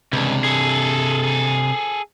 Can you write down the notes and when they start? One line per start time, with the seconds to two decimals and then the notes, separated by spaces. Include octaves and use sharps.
0.13 C#2 C3 D4
0.44 G#4 A4